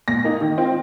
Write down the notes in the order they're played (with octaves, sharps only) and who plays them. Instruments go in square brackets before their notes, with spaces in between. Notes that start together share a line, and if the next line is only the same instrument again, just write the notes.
[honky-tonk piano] A#2 A#6
A#3 D#4
D#3
C4 F4